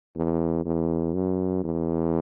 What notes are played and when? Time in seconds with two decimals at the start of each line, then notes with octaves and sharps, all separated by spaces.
0.16 E2
0.65 E2
1.14 F#2
1.64 E2